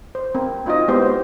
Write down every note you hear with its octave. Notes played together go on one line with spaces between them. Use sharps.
C5
C4 A#4
C4 D#4 F4 F#4 D#5
G#3 B3 E4 G4 C5 D#5
C5 C#5